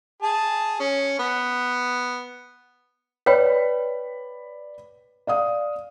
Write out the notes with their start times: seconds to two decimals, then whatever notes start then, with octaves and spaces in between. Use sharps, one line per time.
0.23 G#4 A5
0.80 C#4
1.19 B3
3.26 B4 C#5 D5 G5 B5 B6
5.27 D5 F5 D#6